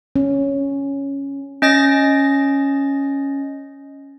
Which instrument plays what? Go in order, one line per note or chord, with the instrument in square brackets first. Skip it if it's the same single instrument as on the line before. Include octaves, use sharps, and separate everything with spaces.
[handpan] C#4
[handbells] C#4 D#5 A6 A#6